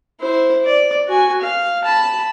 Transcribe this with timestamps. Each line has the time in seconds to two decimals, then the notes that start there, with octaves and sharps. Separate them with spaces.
0.21 E4 C5
0.65 D5
1.08 F#4 G#5
1.42 F5
1.85 A5 B5